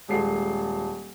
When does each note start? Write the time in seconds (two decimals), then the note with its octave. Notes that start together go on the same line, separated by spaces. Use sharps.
0.09 D#1 G#3 A4 C7